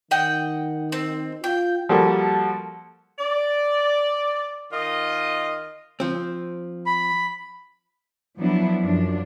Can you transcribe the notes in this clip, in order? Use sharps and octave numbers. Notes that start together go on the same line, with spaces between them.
D#3 D#5 F#5 G5
C4
F4 G5
F3 G3 A#3 F#4 A4
D5
D#3 F4 D#5
F3 C4
B5
F3 F#3 B3 D4 E4
F#2 F3 D4